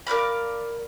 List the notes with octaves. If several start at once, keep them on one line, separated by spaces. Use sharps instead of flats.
A#4 D5 F5 B5